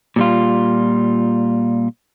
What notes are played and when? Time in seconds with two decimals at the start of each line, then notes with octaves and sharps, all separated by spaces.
0.16 A#2 G3 F4